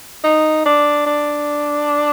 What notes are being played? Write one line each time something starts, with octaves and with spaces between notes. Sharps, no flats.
D#4
D4
D4